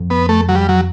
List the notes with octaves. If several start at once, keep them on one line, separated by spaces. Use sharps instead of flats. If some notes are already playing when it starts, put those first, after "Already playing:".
Already playing: F2
B3
A3
F#3
G3
F#3